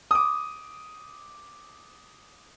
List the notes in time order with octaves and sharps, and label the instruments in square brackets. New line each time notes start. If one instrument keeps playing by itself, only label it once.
[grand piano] D6 D#6